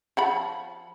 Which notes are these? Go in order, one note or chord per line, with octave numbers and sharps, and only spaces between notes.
F3 F#5 B5